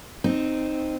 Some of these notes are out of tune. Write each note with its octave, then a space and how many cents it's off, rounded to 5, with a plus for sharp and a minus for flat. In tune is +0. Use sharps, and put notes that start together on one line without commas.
C4 +0 D#4 -5